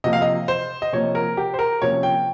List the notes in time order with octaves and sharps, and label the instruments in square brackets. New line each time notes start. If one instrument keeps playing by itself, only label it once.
[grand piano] C3 F3 A#3 D#5
F5
D#5
C5
D#5
C3 F3 A#3 C#5
A#4
G4
C5
A#4
C3 F3 A#3 C#4 C#5
G5